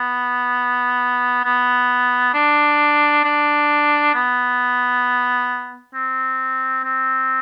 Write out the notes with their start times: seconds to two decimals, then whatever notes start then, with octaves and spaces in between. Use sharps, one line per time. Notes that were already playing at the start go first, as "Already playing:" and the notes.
Already playing: B3
1.44 B3
2.34 D4
3.24 D4
4.14 B3
5.94 C4
6.84 C4